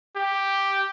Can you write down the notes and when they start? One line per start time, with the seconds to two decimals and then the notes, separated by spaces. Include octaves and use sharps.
0.16 G4